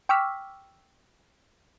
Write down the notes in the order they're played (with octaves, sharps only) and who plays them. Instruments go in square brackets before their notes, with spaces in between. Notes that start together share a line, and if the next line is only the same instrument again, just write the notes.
[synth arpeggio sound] G5 C#6 D6 E6 F6 B6